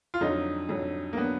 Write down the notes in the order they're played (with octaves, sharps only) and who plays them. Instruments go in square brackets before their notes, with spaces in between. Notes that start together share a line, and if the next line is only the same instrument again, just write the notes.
[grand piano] F4
[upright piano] F2 D3 F#3 [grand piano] D#4
[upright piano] F2 D3 F#3
[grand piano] A#3
[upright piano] D3 F#3 [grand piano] B3